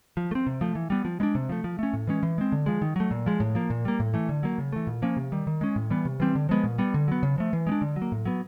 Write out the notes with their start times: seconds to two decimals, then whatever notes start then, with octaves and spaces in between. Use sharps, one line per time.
0.17 F3
0.31 A3
0.35 C4
0.47 C3
0.61 F3 A3
0.75 E3
0.90 G3 B3
1.05 F3
1.20 G#3 B3 D4
1.35 C3
1.49 F3 A3
1.64 F3
1.79 A3 C#4
1.93 A2
2.07 E3 G#3 C#4
2.23 E3
2.38 G#3 C4
2.52 D3
2.66 F3 G#3
2.82 D#3
2.96 F#3 A3
3.11 A#2
3.26 F3 G#3
3.40 A2
3.55 F3 A#3
3.70 A#2
3.85 G3 A#3
4.00 A2
4.14 E3 A3
4.29 D3
4.43 F#3 A#3
4.58 C#3
4.73 E3 A3
4.87 A#2
5.02 F3 A#3 C#4
5.17 C3
5.32 D#3 G3
5.47 D#3
5.61 G#3 C#4
5.76 A2
5.90 E3 G3 B3
6.05 C3
6.20 E3 G3 C4
6.35 D3
6.49 F3 G#3 B3
6.64 A#2
6.78 G3 B3
6.94 D3
7.08 F#3 B3
7.23 C#3
7.38 F3 A3
7.53 E3
7.67 G#3 B3
7.72 D4
7.81 D3
7.96 F#3
8.02 A#3
8.12 A2
8.26 F#3 B3